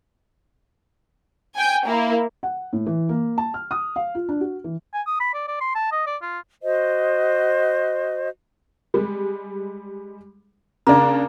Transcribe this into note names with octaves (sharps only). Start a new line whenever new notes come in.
G5 G#5
A#3 E4
F#5
A2
E3
A#3
A5
F6
D#6
F5
F4
D4
F#4
E3
G#5
D#6
B5
D5
D5
C6
A5
D#5
D5
F4
F#4 C5 D#5
G3 G#3
C#3 A#3 D4